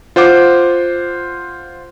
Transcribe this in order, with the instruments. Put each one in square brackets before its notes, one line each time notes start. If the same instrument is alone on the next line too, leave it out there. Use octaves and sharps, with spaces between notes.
[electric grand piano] F4 C5 F#5 D6